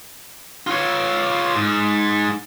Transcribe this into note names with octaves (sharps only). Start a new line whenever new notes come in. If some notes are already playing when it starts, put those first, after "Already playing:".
F4 C#5
G#2